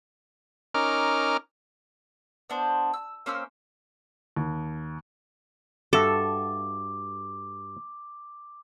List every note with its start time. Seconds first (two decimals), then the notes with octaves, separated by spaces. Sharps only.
0.74 C#4 D#4 A#4 D6 F6
2.50 B3 D4 C5
2.94 E6
3.26 A#3 C#4 C5 E6
4.36 D#2
5.93 G2 F#4 A4 E5 D6